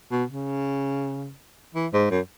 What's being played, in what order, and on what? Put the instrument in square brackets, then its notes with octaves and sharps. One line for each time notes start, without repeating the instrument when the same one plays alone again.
[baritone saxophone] B2
C#3
E3
G#2
F#2